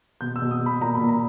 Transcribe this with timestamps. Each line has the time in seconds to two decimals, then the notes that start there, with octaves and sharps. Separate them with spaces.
0.21 B2 G6
0.36 E6
0.42 B2
0.51 D#6
0.61 B2
0.66 B5
0.81 A#2 A#5
0.95 B5
1.01 A#2
1.09 A#5